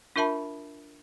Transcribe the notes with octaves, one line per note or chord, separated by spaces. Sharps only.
D4 F4 A#4 E5 A5 B5